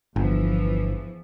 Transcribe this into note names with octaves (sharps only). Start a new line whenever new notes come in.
G1 E2 E3 F3